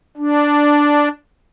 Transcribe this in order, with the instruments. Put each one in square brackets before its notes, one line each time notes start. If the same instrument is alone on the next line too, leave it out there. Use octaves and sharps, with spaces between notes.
[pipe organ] D4